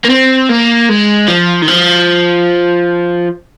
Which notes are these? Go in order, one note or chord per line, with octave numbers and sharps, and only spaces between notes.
A#3
C4
A#3
G#3
F3
D#3
F3